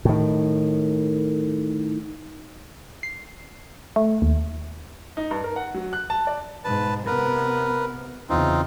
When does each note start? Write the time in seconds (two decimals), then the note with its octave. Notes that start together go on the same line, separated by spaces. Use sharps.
0.05 A2 D#3
3.03 C7
3.96 A3
4.22 D#2
5.17 D#4
5.31 G2
5.44 A#4
5.56 F#5
5.74 F#3
5.93 F#6
6.10 A5
6.27 D5
6.64 G#2 B2 B4 A5
7.06 C3 B3 A#4 B4
8.29 E2 C#3 C4 D#4 F4